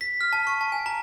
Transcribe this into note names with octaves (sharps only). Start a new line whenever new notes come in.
B6
F6
A5
C#6
A5
G#5
A#5